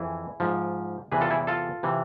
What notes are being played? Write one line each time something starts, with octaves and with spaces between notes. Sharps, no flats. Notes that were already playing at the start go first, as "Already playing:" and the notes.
Already playing: F2 E3 E4 G#4
G#2 F3
E2 C3 E3 G#4 B4
F4 A4
E4 G#4
F4 A4
C3 E3